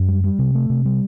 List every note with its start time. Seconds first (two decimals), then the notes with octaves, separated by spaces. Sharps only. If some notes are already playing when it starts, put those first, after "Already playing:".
Already playing: F#2
0.08 G3
0.24 G3
0.39 C3
0.55 A3
0.70 C3
0.85 G3